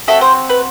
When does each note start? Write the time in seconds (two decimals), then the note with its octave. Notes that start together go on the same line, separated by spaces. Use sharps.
0.08 C4 F#4 A4 E5
0.21 C5
0.50 B4